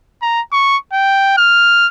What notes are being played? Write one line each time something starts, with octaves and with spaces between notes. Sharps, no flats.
A#5
C#6
G5
F6